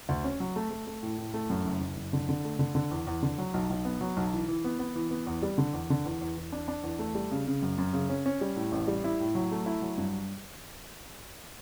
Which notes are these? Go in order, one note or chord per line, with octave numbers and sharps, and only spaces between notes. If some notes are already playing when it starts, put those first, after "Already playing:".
D2
C#4
F#3
A3
A3
A3
A2
A2
A3
F#2
F#1
F#1
F#1
D3
D3
A3
D3
D3
E2
E2
D3
F#3
B1
B1
B3
F#3
B1
E3
E3
B3
B3
E3
B3
E2
G3
D3
E2
D3
E2
E2
E2
D4
D4
E2
A3
G3
C#3
C#3
F#2
F#2
C#3
C#4
C#4
G3
A2
A1
G3
E4
A2
F#3
A3
E4
F#3
G2